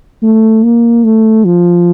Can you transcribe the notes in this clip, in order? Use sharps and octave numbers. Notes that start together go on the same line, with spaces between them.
A3
A#3
A3
F3